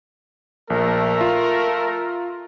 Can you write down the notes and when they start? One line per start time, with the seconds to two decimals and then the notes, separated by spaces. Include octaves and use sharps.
0.70 A#1 A3 A#4
1.21 F4